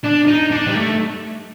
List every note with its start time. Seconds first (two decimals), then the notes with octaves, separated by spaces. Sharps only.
0.04 D4
0.28 D#4
0.51 D4
0.67 G3
0.75 A3